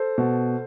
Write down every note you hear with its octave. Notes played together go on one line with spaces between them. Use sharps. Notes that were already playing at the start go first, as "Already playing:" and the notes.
Already playing: A4 C5
B2